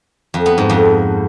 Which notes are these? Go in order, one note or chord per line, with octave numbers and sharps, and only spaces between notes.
F2
B3
G#2
F2